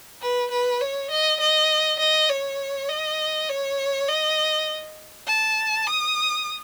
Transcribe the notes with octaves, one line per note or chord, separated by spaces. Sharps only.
B4
B4
C#5
D#5
D#5
D#5
C#5
D#5
C#5
D#5
A5
D#6